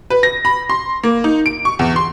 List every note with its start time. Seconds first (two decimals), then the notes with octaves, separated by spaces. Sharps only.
0.10 B4
0.23 A#6
0.45 B5
0.70 C6
1.03 A#3
1.24 D#4
1.46 D7
1.65 C#6
1.79 E2
1.96 C6